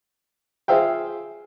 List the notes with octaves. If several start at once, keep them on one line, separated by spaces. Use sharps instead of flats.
F4 G#4 C5 E5 F5 G5